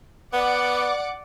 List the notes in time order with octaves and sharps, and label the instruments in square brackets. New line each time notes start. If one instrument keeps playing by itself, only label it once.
[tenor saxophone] B3 [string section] D5 F#5 D6